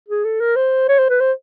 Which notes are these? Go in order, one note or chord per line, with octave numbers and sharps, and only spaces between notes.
G#4
A4
A#4
C5
C#5
C5
B4
C5